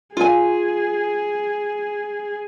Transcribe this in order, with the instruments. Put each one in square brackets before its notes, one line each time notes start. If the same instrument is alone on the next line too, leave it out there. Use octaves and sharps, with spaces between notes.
[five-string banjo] F4 G#5 [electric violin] G#4